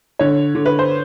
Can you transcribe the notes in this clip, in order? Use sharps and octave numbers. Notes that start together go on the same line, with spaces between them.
D3 C#5
D3
B4
C5